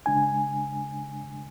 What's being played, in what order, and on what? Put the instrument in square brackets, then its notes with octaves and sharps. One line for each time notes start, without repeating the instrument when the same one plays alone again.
[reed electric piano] C#3 G#3 D4 G#5